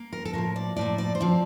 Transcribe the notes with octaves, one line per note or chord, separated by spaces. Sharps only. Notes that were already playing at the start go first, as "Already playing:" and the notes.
Already playing: A#3
A#4
A4
A2 F3 A#3 A#4
D5
A2 F3 A#3 D5
D5
C5
F3 C4 D5